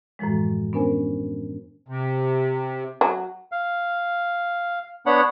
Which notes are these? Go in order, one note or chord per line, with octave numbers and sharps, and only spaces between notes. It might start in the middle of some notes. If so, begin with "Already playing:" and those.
F#2 A2 E3 F3 G#3
B3 C#4 D4 A#4 C5 G#5
C3
F#3
F5
B3 D4 C#5 F#5 B5